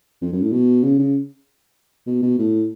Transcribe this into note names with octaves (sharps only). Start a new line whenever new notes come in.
F2
F#2
A2
B2
C#3
C#3
B2
B2
A2